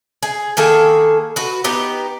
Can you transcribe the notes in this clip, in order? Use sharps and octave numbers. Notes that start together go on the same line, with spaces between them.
G#4
D#3 A#3 G#4 A4
F#4 B4
B3 D#4 G4